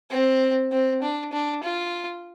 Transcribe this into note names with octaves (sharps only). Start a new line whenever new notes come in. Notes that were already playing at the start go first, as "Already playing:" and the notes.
C4
C4
D4
D4
F4